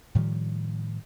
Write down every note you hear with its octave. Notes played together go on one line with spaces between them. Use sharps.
A2 D#3 F3 G3